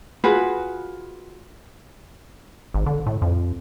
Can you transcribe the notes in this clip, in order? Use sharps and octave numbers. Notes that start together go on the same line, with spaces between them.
F4 F#4 G#4 B4
G#1
D3
A2
F2